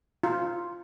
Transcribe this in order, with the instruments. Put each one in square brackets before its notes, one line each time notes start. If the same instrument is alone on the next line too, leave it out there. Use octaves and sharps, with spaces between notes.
[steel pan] F4